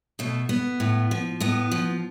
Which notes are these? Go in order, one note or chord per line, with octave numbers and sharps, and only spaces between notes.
B2 A3
B3
A2
F3
A2 B3
F3